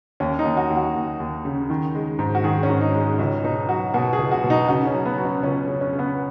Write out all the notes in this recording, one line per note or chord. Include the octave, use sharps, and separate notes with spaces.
D#2 C#4
D#4
D#2
F#4
D#2
F#4
D#2
D#2
C#3
D#3
G#3
G#2
F#4
D#3 G#4
C#4
G#2
D#4
G#3
C#4
C#2 C#4
B2 D#4
F#3 F#4
B2 F#4
G#4
C#2
F#4
B2
D#4
C#3 F#4
C#4
F#3
B3
F#3
C#4
C#2 C#4
C#3
C#4
C#3
B3